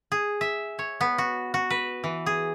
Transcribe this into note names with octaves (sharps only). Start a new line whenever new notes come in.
G#4
E5
C#5
B3
F#4
F#4
B4
E3
G#4